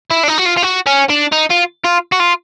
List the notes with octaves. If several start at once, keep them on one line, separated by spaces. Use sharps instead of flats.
E4
D4
D#4
F#4
F4
F4
F#4
C#4
D4
D#4
F4
F4
F#4
F4